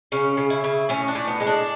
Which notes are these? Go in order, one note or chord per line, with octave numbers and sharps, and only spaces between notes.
C#3 C#4
C#3
E4
C#3
A2 C#4
D4
A2
B3
G#3
D4